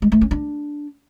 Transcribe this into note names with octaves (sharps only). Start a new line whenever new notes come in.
G#3
A3
C#4
D4